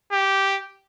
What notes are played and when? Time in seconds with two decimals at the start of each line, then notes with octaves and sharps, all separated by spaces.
0.12 G4